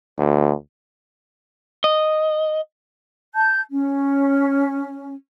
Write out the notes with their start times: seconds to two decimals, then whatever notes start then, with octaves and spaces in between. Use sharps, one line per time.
0.18 D2
1.84 D#5
3.34 A5 G6
3.71 C#4